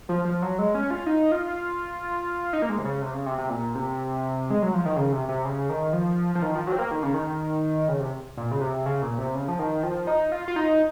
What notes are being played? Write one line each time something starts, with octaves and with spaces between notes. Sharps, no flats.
F3
F3
F#3
G#3
C#4
F4
D#4
F4
D#4
A#3
G#3
C3
C#3
C3
C#3
C3
C3
A#2
C3
G#3
F#3
F3
D#3
C#3
C3
C3
C#3
D#3
F3
F3
D#3
F3
F#3
C4
A#3
D#3
C#3
D#3
C#3
C3
A#2
C#3
C3
C#3
A#2
C3
C#3
F3
D#3
F3
D#4
F4
F4
D#4